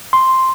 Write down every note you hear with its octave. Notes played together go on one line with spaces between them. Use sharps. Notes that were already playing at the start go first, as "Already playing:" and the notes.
C6